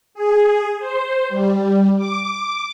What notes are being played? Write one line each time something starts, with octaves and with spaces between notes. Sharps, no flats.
G#4
C5
G3
D6